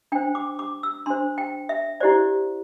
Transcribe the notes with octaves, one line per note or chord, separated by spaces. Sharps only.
D4 C5 G5
D6
D6
E6
D4 C5 C6
G5
E5
E4 G4 C5 D5